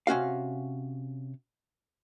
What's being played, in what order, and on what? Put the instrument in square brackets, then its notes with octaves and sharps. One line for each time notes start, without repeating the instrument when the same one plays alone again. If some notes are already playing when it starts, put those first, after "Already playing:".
[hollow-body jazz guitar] C3 C#4 F#4 F5